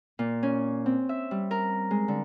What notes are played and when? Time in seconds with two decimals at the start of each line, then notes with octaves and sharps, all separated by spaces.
0.19 A#2
0.43 C#4
0.86 C4
1.09 E5
1.31 G3
1.51 A#4
1.91 G#3
2.08 D3